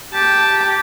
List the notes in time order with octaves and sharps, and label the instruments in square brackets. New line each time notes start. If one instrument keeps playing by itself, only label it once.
[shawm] G4 [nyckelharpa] A5